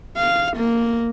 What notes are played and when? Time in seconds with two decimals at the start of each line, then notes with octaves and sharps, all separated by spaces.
0.17 F5
0.57 A#3